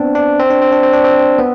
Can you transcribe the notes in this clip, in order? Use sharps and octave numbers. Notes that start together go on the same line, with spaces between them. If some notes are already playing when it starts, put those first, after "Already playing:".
Already playing: B3 C4 D4
D4
C4
D4
C4
D4
C4
D4
C4
B3